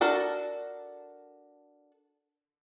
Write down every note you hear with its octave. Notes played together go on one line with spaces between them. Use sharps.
D4 F#4 A4 A#4